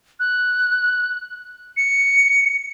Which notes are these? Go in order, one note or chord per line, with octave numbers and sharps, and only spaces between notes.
F#6
C#7